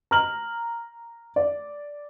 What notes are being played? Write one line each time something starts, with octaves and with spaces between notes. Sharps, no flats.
A#5 F6 F#7
D5